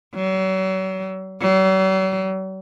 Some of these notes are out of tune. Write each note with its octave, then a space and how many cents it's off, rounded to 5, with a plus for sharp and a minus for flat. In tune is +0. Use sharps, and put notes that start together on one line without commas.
F#3 +40
F#3 +45